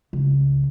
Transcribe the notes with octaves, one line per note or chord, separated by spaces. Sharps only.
C#2